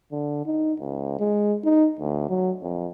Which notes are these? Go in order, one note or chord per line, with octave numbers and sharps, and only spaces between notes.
D3
D#4
C#2
G#3
D#4
D2
F#3
F2